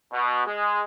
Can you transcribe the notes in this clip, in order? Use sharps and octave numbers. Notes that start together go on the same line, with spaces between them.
B2
G#3